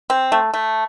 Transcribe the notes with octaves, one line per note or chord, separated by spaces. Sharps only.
C4
A3
A3